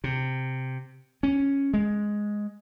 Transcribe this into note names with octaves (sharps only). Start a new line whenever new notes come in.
C3
C#4
G#3